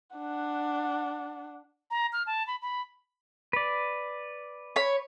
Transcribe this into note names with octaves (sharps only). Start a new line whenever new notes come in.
D4 F#5
A#5
F6
A5
B5
B5
B4 D5
C#5 B5